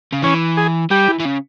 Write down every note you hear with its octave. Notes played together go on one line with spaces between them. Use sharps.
C#3
E3 C#4
G#4
G3 G4
E3
E3
C#3